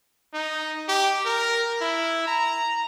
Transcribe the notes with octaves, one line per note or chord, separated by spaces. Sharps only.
D#4
G4
A#4
E4
A#5